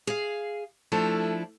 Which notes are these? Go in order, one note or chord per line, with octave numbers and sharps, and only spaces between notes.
G#4 F5
F3 A3 D4 E4 A4